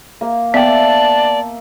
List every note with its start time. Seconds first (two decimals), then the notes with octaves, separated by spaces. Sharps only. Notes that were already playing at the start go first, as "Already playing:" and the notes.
0.21 A#3 F5
0.54 B3 D5 E5 G5 A5